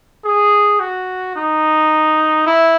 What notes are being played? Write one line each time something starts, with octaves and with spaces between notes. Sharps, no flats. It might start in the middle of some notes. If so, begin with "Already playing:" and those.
G#4
F#4
D#4
E4